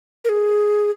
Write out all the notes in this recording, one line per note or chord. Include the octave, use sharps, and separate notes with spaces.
A#4
G#4